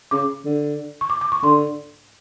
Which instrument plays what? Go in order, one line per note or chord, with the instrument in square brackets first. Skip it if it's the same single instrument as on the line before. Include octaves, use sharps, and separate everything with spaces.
[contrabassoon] C#3 [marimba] D6
[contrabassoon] D3
[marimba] C#6
D6
D6
C#6
[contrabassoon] D3 [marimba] C6